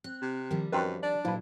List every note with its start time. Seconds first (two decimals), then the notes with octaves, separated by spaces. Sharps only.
0.04 C4 F#6
0.22 C3
0.51 D#3 F3 G3
0.72 F#2 D#3 C4 B4
1.03 D4 D5
1.25 A#2 F3 F#3 E4 B4